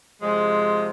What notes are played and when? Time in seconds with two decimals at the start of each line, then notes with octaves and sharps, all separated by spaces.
0.22 C3 F3 G#3